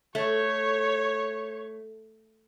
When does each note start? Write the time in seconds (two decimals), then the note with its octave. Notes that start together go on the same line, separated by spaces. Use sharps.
0.15 A3 C#5